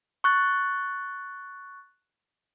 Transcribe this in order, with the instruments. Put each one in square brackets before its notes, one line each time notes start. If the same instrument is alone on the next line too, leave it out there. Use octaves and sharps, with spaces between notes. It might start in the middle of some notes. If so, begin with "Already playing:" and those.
[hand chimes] C#6 F#6 A6